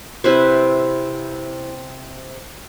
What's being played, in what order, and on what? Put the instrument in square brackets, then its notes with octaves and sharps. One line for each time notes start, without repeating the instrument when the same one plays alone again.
[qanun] C3 E4 B4 C5